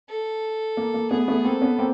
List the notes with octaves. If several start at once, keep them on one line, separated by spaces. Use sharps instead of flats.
A4
A#3
A#3
A3 B3 G#4
A3 B3
A#3 C4 A4
B3 C#4
A#3 C4